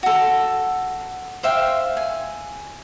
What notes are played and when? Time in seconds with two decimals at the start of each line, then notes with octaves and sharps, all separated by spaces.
0.03 F#4 A4
1.43 C5 E5 F5 G5
1.97 G#5